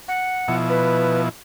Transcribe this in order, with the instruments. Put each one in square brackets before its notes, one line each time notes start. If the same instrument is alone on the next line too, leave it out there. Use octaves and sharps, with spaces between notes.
[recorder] F#5
[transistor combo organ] B2 F3 E4
[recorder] B4